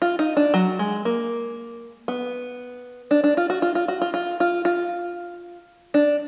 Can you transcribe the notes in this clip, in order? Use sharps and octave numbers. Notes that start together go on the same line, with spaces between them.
F4
D#4
D4
F#3
G#3
A#3
B3
D4
D4
F4
F#4
F4
F4
F#4
F4
F4
F4
F4
D4